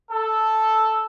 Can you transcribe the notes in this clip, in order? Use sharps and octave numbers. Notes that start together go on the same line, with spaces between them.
A4